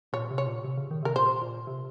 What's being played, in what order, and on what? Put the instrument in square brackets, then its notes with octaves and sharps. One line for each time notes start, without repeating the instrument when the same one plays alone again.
[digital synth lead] A#2 [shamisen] C#5
[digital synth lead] C3
[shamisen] C#5
[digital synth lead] A#2
C3
C#3
D#3
[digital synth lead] C3 [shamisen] A#4
[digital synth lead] A#2 [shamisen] C5
[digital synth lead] A#2
C3